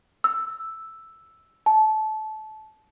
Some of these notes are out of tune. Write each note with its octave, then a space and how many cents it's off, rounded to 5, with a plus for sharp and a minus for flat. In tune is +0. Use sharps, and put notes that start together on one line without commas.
E6 +0
A5 -20